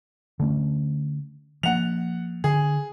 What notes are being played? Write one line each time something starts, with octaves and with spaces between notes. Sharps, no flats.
D3 A3 C#4
F3 A#3 F#5 F7
D3 G#4